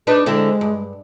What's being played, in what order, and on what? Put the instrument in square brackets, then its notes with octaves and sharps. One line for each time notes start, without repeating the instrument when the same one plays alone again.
[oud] D4 D#4 B4 [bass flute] G#4
[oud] D3 C4 E4 [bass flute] G#3
[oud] G2